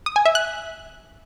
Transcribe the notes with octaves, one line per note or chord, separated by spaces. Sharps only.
D#6
G#5
E5
F#6